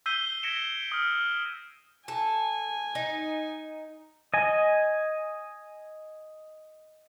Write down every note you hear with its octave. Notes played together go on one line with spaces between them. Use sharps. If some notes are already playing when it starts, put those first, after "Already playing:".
E6 G6 B6 C7 D#7 G7
G#6 A#6 B6 C#7 D7 E7
D#6 F6
A4 G#5
D#4
D#5 G#5